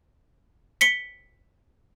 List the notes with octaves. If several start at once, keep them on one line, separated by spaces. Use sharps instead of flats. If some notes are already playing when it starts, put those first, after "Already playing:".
B6 C#7 G7